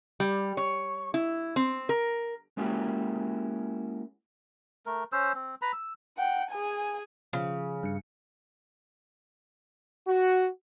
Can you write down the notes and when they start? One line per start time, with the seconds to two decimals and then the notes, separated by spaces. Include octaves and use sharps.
0.20 G3
0.57 C#5
1.14 E4
1.56 C4
1.89 A#4
2.57 G#3 A#3 C#4 E4 F#4 G4
4.86 A3 A#4
5.12 C#4 C5 E6
5.34 C4
5.62 B4 A#5 B5
5.73 E6
6.17 F#5 G5
6.51 G#4 G#5
7.33 C#3 F3 C#4
7.83 G2 C#7
10.08 F#4